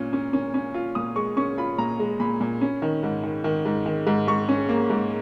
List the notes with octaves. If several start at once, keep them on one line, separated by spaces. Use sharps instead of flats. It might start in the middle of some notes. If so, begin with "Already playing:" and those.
Already playing: A#2 C#4 F4
C#4
C#4
C#4
F4
A#2 D#6
G#3 C#6
C#4 C#6
F4 B5
A#2 A#5
G#3
A#2 B5
A#2
C#4
D#3
G#2
D#3
D#3
G#2
D#3
G#2
G#2 C#6
C#4
A#3
G#2